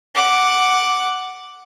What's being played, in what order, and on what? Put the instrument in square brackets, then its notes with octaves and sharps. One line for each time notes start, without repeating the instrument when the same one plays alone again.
[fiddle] F#5 D6